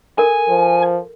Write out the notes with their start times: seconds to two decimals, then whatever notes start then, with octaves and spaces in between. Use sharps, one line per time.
0.18 A4 A#4 G#5
0.49 F3